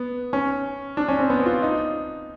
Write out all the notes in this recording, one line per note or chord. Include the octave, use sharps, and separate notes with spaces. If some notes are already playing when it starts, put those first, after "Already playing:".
Already playing: B3
C#4
D4
C#4
C4
B3
F4
D#4